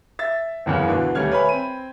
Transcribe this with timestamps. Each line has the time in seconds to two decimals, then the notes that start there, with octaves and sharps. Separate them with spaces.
0.19 E5 A6
0.66 F#1 E2 C#3
0.88 D2 B2 D3 E3
1.15 D#2 G3 A3 C#4 F6 G#6
1.32 B4 C#5 E5 G#5 B5
1.49 C4 B5 D#7